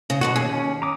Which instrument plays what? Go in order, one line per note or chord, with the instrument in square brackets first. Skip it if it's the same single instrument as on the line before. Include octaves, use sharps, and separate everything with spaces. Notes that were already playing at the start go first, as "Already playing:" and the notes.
[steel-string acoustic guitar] C#3
[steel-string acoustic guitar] F#2 B2 D3 [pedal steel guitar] F#4
[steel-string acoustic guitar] D#2 [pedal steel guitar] C#4 G#4
[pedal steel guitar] C#4
A#5 D6 D#6